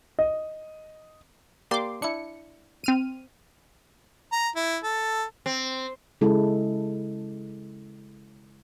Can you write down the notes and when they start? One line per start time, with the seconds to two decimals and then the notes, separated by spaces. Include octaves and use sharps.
0.19 D#5
1.71 A#3 G4 D5 C6 D6
2.02 D4 E4 C#7
2.84 C4 F6 D#7
4.32 A#5
4.56 E4
4.83 A4
5.46 C4
6.21 C#3 G#3 E4 A4